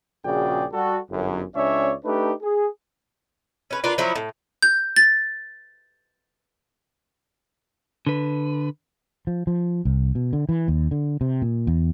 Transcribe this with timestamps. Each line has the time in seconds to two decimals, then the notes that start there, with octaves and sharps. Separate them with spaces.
0.25 A#1 C#3 F#4 G#4 D5 G5
0.73 G3 F#4 A4
1.10 G1 F#2
1.55 C#2 C#4 D4 C#5 D5 E5
2.04 A3 D4 D#4 G4 B4
2.42 G#4
3.71 C#4 B4
3.84 D4 F4 A#4 B4
3.98 F3 F#3 E4
4.15 A2
4.62 G6
4.96 A6
8.07 D3 B4
9.27 F3
9.47 F3
9.85 C2
10.15 B2
10.33 D3
10.49 E3
10.68 D#2
10.91 D3
11.21 C3
11.42 A#2
11.67 E2